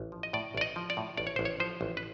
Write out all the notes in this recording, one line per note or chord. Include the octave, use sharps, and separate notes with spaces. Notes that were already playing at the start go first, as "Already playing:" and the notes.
Already playing: A1
F3
D#5
A2 D5
A1 D5
D#5
F3
D5
A2
A1 D5
C#5
A1 C5
C#5
F3 C5
A1
B4